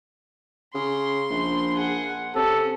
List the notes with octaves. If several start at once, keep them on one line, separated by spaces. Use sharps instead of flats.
C#3 C6
A#1
G#4 F#5
C3 C#4 A4